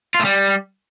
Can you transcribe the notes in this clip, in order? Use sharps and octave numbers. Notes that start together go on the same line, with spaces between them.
F4
A3
G3